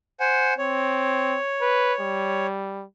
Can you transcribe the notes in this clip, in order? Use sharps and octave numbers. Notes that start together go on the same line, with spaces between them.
C5 F#5 G#5
C4 C#5
B4
G3